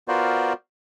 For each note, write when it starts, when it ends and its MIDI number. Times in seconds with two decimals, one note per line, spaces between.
0.08 0.53 59
0.08 0.53 65
0.08 0.53 66
0.08 0.53 70
0.08 0.53 72
0.08 0.53 74